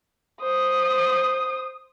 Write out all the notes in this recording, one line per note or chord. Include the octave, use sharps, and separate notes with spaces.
C5 D#6